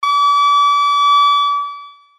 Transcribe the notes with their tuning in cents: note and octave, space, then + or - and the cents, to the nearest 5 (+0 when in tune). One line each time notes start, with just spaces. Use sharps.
D6 -35